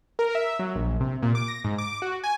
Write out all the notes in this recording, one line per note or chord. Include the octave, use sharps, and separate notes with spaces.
A#4
E5
F#3
A#1
C3
A#2
D6
A#6
G#2
D6
F#4
G#5